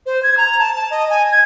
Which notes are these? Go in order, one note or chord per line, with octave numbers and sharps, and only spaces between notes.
C5
G#6
A#5
A5
A5
D#5
G#5
G#6